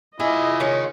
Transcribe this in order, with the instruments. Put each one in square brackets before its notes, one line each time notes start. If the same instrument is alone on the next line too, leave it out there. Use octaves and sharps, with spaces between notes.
[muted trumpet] E4 [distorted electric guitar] F4 G#5 [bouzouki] G#4 [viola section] D#5
[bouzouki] D#3 G#3 C#4